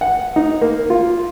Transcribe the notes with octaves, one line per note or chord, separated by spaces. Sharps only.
F#5
D#4
A#3
F4